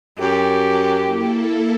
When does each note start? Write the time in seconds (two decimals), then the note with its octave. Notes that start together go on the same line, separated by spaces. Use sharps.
0.19 F#2 G4
1.03 A#3 E4 A4